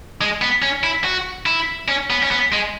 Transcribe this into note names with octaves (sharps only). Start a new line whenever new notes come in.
G#3
B3
C#4
E4
F#4
E4
C#4
B3
C#4
B3
G#3